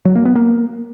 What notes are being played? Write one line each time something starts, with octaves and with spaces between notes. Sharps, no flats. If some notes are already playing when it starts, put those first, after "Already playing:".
F#3
A#3
B3
A#3